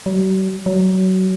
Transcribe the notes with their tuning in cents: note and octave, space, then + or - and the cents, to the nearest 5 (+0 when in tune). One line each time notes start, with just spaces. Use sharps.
F#3 +45
F#3 +20